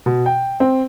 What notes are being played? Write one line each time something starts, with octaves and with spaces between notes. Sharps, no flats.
B2
G5
C4